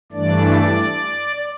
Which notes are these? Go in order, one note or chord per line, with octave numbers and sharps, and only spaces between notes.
G2 E3 A3 D4 D5